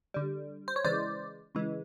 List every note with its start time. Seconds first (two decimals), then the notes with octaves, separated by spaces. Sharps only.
0.14 D3 G3
0.68 C5
0.76 C#5
0.84 C#3 E3 G#3 C5 D5
1.55 C#3 E3 G#3